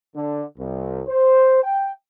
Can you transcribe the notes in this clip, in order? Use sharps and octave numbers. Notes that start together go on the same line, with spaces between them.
D3
C2
C5
G5